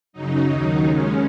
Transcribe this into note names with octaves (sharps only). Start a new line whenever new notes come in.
F#2 C#3 F#3 D#4
D#2 D#3 F#3
D#2 C#3 G#3 C#4